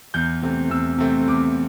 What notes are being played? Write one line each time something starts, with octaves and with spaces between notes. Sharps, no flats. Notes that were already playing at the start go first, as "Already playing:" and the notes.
E2 G6
C3 A3 C4
E2 E6
C3 A3 C4
E2 D6